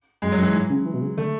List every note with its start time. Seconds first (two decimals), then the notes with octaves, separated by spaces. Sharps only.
0.22 F#2 G#3
0.32 F#3
0.38 F#2
0.43 E3
0.54 G#2
0.70 C#3
0.85 E3
0.94 B2
1.02 C#3
1.17 D3 A3